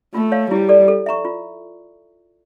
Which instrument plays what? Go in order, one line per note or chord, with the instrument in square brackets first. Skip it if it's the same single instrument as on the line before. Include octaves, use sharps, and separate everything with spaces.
[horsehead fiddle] A3 [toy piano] F4
[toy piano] C#5 F5
[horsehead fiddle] G3 [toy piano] E4
[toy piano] A4 D5
A4
E5 A#5 C#6
F4